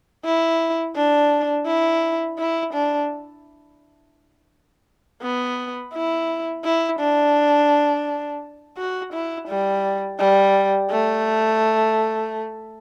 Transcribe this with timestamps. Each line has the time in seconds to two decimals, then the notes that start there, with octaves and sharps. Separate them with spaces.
0.25 E4
0.96 D4
1.66 E4
2.38 E4
2.74 D4
5.22 B3
5.93 E4
6.64 E4
7.00 D4
8.78 F#4
9.13 E4
9.48 G3
10.19 G3
10.90 A3